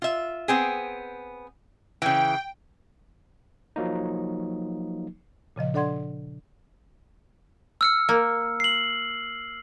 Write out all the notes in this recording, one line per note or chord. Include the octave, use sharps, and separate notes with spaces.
F4 E5
B3 C4 G#4
C#3 E3 G5
F3 F#3 A#3 D#4
A#2 C#3 F3 D#5
D4 A4 D5 F#5 C6 G#6
E6 F6 C#7
A#3
C7 F#7